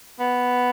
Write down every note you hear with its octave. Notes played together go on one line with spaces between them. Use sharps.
B3